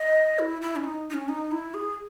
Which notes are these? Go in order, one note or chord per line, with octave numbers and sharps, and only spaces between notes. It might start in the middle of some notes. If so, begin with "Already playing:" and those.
Already playing: D#5
E4
E4
C#4
D#4
D#4
C#4
D#4
E4
G#4